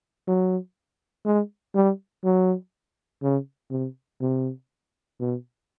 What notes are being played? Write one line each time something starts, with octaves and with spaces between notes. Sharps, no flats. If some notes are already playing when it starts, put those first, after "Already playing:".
F#3
G#3
G3
F#3
C#3
C3
C3
B2